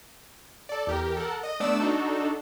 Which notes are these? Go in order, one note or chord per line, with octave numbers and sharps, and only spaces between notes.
A4 D5
E2 G4 A#4
A4 A#4 F#5
D#5
A3 B3 D4 D5 D6 E6
D4 D#4 F#4 A4